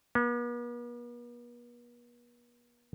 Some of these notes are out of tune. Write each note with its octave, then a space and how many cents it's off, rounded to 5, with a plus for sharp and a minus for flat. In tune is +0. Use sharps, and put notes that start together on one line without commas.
B3 -45